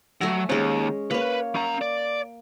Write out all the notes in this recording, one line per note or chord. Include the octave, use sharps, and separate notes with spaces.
F#3 A3 G#5 A#5
D#2 G#3 C#4
A#3 B4 C#5
C#4 A#5
D5